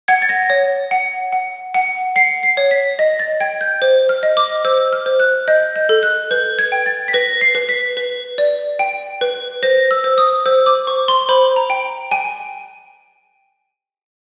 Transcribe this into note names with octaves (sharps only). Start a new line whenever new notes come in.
F#5 G#6
A6
A#6
C#5
F#5
F#5
F#5
F#5 C7
C7
C#5
B6
D#5 A#6
A6
G5 G#6
G6
C5
F6
D#5
D6
C5 E6
F6
C5
F#6
D#5 G6
G6
A4
F#6
B4 G6
G#6
G5
A6
B6
B4 A#6
C7
B4
B6
B4
D5
G5
B4
C5 A#6
E6
C5
D#6
C5 E6
D6
C5 C#6
C6
C5 B5
A#5
G5
G5 G#5